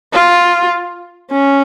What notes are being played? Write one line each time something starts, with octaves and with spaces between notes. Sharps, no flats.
F4
C#4